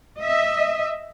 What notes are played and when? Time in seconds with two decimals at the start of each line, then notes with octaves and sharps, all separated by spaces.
0.18 D#5 E5